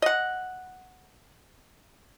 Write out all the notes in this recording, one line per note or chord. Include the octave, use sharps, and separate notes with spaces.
D#5 F#5